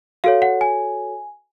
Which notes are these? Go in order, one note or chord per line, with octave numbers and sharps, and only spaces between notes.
F#4 A4 C#5 F5
F#5
G#5